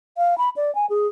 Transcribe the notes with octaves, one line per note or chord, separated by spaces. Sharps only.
F5
B5
D5
G#5
G#4